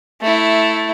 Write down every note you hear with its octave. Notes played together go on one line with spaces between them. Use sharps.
A3 E4